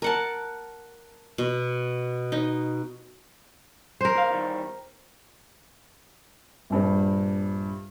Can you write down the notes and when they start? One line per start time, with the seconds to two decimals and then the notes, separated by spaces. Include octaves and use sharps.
0.02 A#4 F#5 A5
1.38 B2
2.32 D#4
4.01 A#4 C5
4.15 D2 F5
4.30 E2 D#3 G3
6.70 A#1 G2 G3